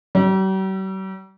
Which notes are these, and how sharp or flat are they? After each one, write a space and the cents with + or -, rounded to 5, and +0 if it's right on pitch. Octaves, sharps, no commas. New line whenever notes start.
G3 -45